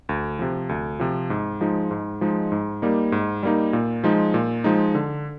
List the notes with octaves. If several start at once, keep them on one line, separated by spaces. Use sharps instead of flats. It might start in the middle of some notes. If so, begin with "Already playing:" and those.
D2
C3 F3
D2
C3 F3
G#2
F3 G#3 D#4
G#2
F3 G#3 D#4
G#2
G3 A#3 D#4
G#2
G3 A#3 D#4
A#2
F3 G#3 D#4
A#2
F3 G#3 D#4
D3